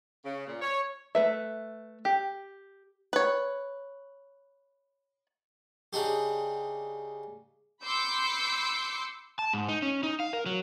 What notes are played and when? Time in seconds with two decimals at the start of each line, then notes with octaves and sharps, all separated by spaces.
0.24 C#3
0.47 A#2
0.61 C#5
1.15 A3 B4 E5
2.05 G4
3.13 B4 C#5
5.93 C#3 D4 D#4 G4
7.84 B5 C6 D6 E6 G6 C#7
9.39 A5
9.53 G#2
9.69 D#4
9.82 C#4
10.03 D#4
10.20 F5
10.33 A#4
10.46 F#3